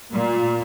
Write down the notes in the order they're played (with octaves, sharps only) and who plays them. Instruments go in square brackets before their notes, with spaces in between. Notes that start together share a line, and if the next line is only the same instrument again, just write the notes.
[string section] A#2